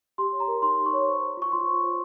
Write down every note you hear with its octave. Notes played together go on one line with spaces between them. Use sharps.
G4 C6
C#5
A#5
A#4
D#4 C6
G4
C#6
C#5
C5
C5
F4 C#6
F4 C6
C5
C5